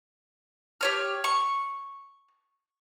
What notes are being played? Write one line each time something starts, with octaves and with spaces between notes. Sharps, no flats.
G4 C#5 F6
C#6